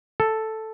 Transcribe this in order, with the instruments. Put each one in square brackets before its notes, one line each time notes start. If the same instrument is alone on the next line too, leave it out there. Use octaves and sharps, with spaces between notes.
[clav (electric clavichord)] A4